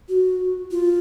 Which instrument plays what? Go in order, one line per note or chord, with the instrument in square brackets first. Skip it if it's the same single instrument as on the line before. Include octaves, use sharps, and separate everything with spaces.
[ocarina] F#4
F4